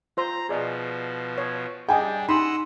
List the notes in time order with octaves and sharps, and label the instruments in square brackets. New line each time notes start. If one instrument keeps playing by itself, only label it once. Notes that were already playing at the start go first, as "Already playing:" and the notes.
[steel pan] F4 C5 C6 [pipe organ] A#5
[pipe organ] B2 F3 [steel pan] G#4 D5 D#5
[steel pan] C#5
[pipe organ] G3 D4 [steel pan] G#4 D#5 [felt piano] G5 G#5
[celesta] D#4 [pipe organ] D#5 F#5 E6 [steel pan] B5 [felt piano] C6